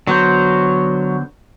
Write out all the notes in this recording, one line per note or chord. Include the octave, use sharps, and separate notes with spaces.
D3 F#3 B3 C5